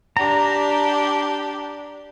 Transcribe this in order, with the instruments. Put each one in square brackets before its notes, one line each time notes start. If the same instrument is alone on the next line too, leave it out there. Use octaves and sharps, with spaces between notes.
[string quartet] D4 G4 [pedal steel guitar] A#5